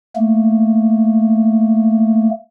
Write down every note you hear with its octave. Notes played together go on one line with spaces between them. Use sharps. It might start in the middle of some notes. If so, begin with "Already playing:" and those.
A3 A#3